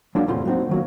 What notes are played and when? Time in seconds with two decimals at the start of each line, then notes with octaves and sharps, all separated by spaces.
0.15 F#3 G#3 A#3 C#4 D4 F4
0.27 E2 A2 C3 F4 A#5 C6
0.45 F#3 A#3 C4 D#4 F#4
0.69 D#3 F#3 A#3